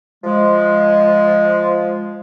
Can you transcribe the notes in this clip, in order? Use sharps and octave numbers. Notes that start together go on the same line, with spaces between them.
F3 G#3